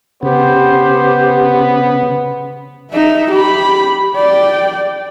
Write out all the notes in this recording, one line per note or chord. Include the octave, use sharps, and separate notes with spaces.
C#3 B3 G4 C5
D#4 E5
G4 B5
D5 G5